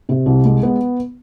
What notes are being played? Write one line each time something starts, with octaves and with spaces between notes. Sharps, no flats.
C3
C2
G#3
B3